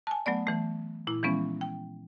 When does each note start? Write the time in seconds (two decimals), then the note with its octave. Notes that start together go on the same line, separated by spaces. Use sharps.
0.07 G#5 A5
0.26 F#3 A3 B3 D5
0.47 E3 A3
1.07 A#2 E4
1.23 E3 F3 G#3 B3 C#4
1.61 G5